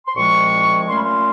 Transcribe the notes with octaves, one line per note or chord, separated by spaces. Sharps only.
C6
C2 A#2 F3 G#3 C4 C#6
A#2 F#3 A3 C#4 C6
B5
C6